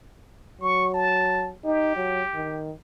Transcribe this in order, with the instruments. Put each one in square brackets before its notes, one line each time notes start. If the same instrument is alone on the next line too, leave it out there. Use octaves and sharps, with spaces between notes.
[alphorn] F#3 [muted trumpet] C#6
[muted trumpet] A5
[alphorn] D#4 [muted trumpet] G4
[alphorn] F#3
D#3